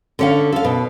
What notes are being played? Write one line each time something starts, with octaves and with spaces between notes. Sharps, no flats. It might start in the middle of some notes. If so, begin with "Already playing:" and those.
D3 C#4 F5
A4 F5
B2